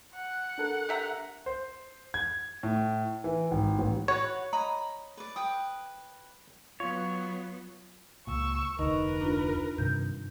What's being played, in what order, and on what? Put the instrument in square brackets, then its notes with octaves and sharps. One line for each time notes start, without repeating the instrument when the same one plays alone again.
[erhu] F#5
[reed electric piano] D4 A4 A#4
[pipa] G4 E5 A#5
[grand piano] C5
G#6
A2
E3
G#1
A1
[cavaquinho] F#4 B4 F#5 [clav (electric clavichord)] C#5
[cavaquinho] D#5 A#5 B5
B4 D5
B4 G5 D#6
[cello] F#3 B3 [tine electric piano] F4 [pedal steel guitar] C#5
[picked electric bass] C#2 A#2 [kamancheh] C#6 E6
[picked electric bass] F1 D2 [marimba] D#4 D#5 C#6 [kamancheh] A#4 B4
[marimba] D4 F4
[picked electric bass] G2 C3 D#3 [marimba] G6